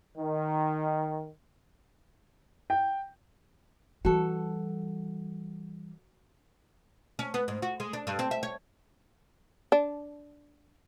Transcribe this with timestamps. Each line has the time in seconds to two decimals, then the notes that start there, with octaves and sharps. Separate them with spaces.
0.17 D#3
2.70 G5
4.05 E3 G3 F#4 A4
7.19 C#4
7.34 B3
7.48 G#2
7.62 F#4
7.80 G#3
7.93 D4
8.07 G2
8.19 C4
8.31 E5
8.43 C#5
9.72 D4